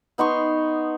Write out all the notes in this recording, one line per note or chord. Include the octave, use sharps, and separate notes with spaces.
B3 D#4 C6 C#6